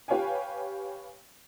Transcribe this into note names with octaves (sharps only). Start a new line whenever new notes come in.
G4 B4 C#5 F5 G5 G#5